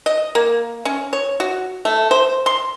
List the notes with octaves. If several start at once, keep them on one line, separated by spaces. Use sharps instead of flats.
D#5
A#3
C#4
C#5
F#4
A3
C5
C6